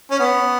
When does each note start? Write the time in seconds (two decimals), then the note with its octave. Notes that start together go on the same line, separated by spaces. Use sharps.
0.11 C#4
0.20 B3